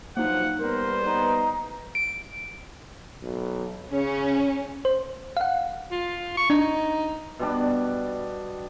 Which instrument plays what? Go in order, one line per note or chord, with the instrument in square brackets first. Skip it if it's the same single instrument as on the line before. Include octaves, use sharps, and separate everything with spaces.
[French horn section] G2 F3 F#3 [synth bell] A#3 D#4 [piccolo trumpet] F#5
[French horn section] G3 B3 [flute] A#4 [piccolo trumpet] C5
[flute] D#4 [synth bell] B4
[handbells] D7
[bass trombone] B1
[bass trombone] C#3 [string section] C#4
[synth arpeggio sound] C5
F5 F#5
[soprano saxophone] F4
C#6
[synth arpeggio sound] D4 [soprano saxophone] D#4
[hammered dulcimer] B2 G3 D4